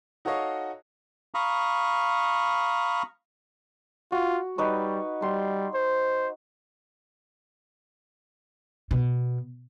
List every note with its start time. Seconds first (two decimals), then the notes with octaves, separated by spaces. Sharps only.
0.25 D#4 F#4 A4 C#5 D#5 F5
1.34 F5 A#5 B5 C#6 D#6
4.12 F4 F#4
4.58 G3 D#4 B4 C#5
5.22 G3 C6
5.74 C5
8.91 B2